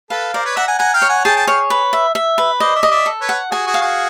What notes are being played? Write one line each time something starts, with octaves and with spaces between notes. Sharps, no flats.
A4 B4 F5
A#4 C5 D5
B4 C#5
E5 F#5 A#5
F#5 G#5
F#5 G#5 A#5
F5 G5
C#5
F#5 G#5
G#4 G5 A5
G5 A5
C#5 F5 G5
B4
E5
E5
B4
C5 D5 D#5
D5 E5
D#5
D5 E5
A4
B4 C#5
F#5
F#4 G#4 G#5
F#4 G#4
F5
F#4 G#4